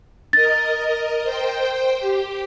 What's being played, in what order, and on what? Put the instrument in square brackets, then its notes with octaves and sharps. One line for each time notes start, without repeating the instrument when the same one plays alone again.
[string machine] A#4 D#5 [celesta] A6
[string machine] C5 G5
G4